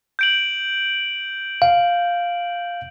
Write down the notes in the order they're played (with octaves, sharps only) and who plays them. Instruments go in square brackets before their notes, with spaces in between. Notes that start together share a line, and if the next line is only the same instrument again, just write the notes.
[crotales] G6 D7 F#7
[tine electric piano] F5